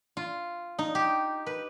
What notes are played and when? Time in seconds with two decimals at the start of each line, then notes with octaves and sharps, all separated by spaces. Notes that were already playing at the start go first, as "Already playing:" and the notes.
0.17 F4
0.79 D#4
0.95 G4
1.46 B4